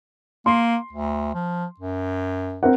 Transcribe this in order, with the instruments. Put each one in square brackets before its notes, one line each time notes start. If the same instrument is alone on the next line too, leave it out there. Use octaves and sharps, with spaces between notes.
[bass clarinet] A#3 [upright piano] C6
[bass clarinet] D2
F3
F#2
[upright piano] C4 A#4 F#5